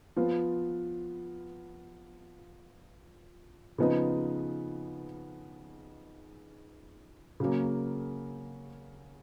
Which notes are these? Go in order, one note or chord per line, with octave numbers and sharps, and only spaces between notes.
F3 B3 F4
C#3 F3 B3 D#4
C#3 F#3 A#3